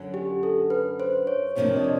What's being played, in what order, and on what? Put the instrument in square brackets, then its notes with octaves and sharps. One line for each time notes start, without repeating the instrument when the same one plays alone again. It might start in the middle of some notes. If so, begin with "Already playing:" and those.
Already playing: [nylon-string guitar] F#2 D3 F#3
[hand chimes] G4
A4
B4
C5
C#5
[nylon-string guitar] F2 C3 F3 A#3 D4 [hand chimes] C#5
[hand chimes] D#5
D5